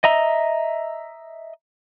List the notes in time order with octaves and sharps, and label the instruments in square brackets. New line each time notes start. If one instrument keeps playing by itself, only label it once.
[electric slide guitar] D#5 E5 A#5